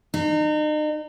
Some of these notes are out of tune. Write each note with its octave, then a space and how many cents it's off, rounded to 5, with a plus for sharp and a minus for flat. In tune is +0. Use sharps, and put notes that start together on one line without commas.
D#4 -35